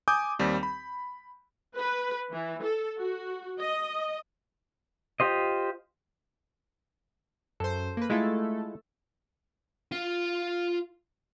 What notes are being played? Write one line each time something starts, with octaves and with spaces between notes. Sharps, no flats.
G#5 D6 D#6 G6
D#2 G3 C4
B5
B4
E3
A4
F#4
D#5
F4 G4 C5 D#5
F#2 A4 C5
A#3 B4
G#3 A3 E4 F4 A4
F4 F5